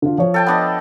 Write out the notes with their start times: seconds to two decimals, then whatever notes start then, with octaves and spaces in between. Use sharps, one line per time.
0.02 D3 F4
0.18 F3 C#5
0.34 A4 G5 A5
0.47 B3 D4 D#5